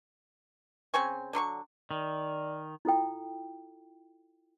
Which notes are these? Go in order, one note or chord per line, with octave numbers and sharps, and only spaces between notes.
C#3 C4 G#5 C#6
D3 F#3 C6 C#6
D#3 D5
E4 F4 A4 G5